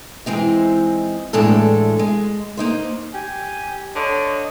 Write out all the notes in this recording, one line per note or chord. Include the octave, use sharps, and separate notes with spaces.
E3 G#3 C4 D#4
E2 A2 G#3 D4 A4
G#3
A#3 D#4 C5
G4 G#5
D3 C#5 D#5